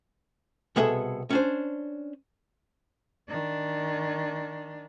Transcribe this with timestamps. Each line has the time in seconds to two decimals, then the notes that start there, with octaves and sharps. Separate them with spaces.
0.76 C2 B2 B3 G#4 A4 E5
1.30 C#4 D4 C5
3.28 D#3 D4